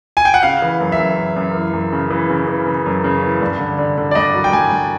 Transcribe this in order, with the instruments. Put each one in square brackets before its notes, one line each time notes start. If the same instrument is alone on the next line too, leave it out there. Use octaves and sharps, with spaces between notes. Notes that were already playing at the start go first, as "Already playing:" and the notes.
[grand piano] G#5
G5
F#5
C#3 F5
E3
F#2
E5
F#2
F#2
F#2
E3
F#2
C#3
E3
C#3
E3
C#3
F#2
C#3
E3
G2
D3
D3
D3
D5
G2 D#5
F#3
G5
G2 G#5
G2